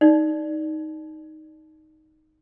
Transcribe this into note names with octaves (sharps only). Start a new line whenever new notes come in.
D#4 D5